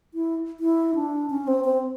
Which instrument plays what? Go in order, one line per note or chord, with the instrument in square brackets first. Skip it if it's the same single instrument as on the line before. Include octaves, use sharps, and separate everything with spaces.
[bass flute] E4
E4
D4
C#4
C4
C4